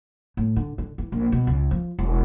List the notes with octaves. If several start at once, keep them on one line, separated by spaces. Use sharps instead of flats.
A2
D3
D3
E3
A#1
B2
C#2
F3
E1